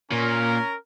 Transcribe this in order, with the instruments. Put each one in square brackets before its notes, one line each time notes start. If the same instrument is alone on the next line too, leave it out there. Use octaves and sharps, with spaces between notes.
[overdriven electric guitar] A#2 [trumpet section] C#4 A#4